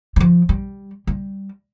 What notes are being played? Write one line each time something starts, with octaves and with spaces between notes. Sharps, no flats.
E3
F3
G3
G3